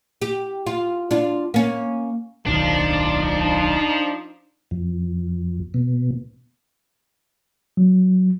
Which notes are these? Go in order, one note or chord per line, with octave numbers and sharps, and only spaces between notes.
G4
F4
D4 F4
A#3 C#4
D1 B1 D#3 F3 D4 D#4
F2
B2
F#3